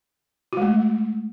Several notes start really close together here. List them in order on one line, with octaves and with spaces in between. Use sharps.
F#4 G#3 A3